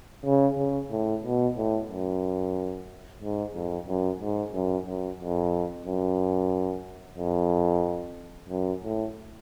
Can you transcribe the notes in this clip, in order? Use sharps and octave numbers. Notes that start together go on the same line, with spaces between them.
C#3
C#3
A2
B2
A2
F#2
G#2
F2
F#2
G#2
F#2
F#2
F2
F#2
F2
F#2
A2